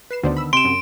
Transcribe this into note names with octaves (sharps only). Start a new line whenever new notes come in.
B4 C7 E7
D2 D3 D#3 B3 C5 D5
B5 E6
C3 C6 D7 E7
F#2